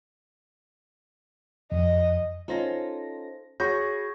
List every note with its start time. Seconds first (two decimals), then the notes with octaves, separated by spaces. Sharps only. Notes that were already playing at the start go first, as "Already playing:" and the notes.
1.72 F2 D#5
2.48 C#4 D#4 F4 A4 C5 A#6
3.60 F#4 G#4 C#5 B5 C#6 G6 A#6